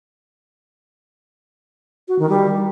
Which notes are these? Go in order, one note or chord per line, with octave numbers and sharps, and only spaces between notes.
F#4
D#3
G3